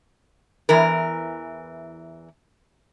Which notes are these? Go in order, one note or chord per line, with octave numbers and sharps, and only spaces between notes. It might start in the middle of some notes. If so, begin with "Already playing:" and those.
E2 E3 A#4